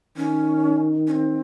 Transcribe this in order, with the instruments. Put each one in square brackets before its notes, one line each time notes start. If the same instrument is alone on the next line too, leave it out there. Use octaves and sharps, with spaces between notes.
[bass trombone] D#3 [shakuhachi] C#4
[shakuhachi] C#4
C4